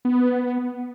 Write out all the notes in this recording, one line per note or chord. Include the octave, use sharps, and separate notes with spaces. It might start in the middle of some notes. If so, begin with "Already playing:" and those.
B3